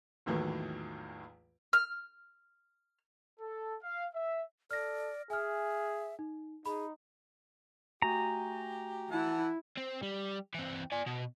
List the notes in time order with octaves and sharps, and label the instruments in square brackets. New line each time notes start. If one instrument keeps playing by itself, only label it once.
[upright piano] A#1 E2 A2 D#3 E3 F#3
[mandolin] F6
[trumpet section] A4
F5
E5
[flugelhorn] A4 [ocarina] D5 [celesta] F6 A#6
[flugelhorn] G#4 [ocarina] E5 [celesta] G#5 F6
[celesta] D#4
[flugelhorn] D#4 [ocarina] G#4 [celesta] B5
[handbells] A3 F#4 G#5 [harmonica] G4 [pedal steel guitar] A#5
[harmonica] E3 F#5 A5 [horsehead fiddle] E4
[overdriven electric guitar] C4
G3
E3 C4
D5 G#5
B2